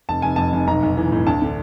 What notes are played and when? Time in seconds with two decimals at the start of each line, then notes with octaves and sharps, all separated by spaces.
0.09 F1 A5
0.22 F1 G#5
0.36 F2 A5
0.53 F1
0.67 B1 A#5
0.83 B1
0.97 E3
1.12 A2
1.27 D2 A5
1.42 D3